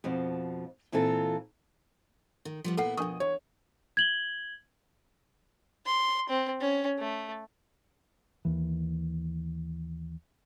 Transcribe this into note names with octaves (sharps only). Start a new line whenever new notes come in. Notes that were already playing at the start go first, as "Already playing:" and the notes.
F2 B2 F3
A#2 E3 C4 F4 A4
D#3
F3 G3 B3
A#2 B3 E4 A4 F#5
F2 B2 D4 A#4 C#6 D#6
E2 C#5
G#6 F#7 G7
C6
C4
C#4
A3
D#2 E3